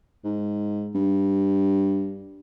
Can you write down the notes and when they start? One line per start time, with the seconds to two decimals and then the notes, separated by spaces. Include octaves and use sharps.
0.24 G#2
0.95 G2